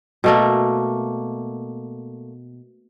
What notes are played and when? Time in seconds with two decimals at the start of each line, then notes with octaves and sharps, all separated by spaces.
0.24 B2 A3 A#3